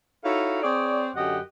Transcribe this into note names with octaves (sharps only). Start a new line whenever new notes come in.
D#4 E4 F#4 A4 C#5 F5
C4 G#4 C#5 D5
F#2 D3 G4 D#5 F#5